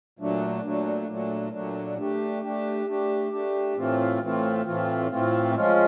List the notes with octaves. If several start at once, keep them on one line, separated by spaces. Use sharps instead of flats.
A#2 F#3 A3 D4
A#2 F#3 A3 D4
A#2 F#3 A3 D4
A#2 F#3 A3 D4
A3 D4 G4
A3 D4 G4
A3 D4 G4
A3 D4 G4
A2 E3 A3 C4 F4
A2 E3 A3 C4 F4
A2 E3 A3 C4 F4
A2 E3 A3 C4 F4
F3 G#3 C#4 F4